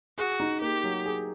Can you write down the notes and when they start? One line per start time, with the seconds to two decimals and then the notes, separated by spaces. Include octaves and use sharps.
0.18 F#4 G#4
0.40 D#4
0.61 A#3 G4
0.84 F#3
1.05 G#4